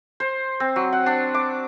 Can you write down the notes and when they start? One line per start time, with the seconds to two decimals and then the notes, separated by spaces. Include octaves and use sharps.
0.20 C5
0.60 C4
0.76 F#3
0.93 F#5
1.06 D4
1.34 D6